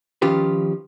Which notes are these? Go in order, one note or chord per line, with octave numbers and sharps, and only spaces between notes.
D#3 F3 C#4 F4 G4 B4